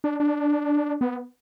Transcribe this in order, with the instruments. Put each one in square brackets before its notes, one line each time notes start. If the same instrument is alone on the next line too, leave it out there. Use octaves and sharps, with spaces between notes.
[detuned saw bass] D4
D4
B3